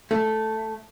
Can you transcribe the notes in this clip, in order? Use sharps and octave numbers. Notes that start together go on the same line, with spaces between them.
A3